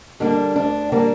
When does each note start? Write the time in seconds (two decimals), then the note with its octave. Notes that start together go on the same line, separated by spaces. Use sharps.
0.20 D3 G3 A#3 D4
0.56 D2 D4
0.92 D3 G3 A#3 D4